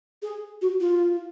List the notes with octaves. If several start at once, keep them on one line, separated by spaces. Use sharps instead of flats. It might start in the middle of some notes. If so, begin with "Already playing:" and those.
G#4
F#4
F4